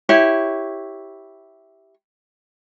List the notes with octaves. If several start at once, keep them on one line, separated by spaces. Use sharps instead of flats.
E4 G4 C#5